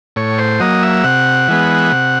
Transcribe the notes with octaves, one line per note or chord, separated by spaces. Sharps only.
A2 C#5
C5
F#3 A#3 D#5
E5
C3 F#5
E3 G#3 B3
C3